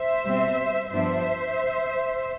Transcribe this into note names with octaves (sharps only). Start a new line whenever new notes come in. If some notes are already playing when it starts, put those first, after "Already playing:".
Already playing: C5 E5
B2 G3 C4
G2 F3 B3 D4 C5 E5